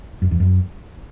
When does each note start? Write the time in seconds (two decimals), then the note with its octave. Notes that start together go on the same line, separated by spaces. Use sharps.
0.22 F#2
0.31 E2
0.40 F#2